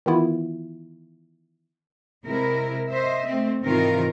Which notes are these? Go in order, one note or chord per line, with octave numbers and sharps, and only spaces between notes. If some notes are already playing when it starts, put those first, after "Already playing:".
D#3 E3 B3 E4 F4
C3 G#3 E4 A#4
C5 D#5 E5
A3 C4
G#2 C3 D#3 E3 F4 A#4